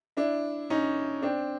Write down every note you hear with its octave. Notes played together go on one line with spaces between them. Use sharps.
D4 E4
C#4 D#4
C4 D4